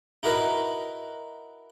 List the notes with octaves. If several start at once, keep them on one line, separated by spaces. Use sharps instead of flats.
D#4 E4 F#4 A#4 B4 D#5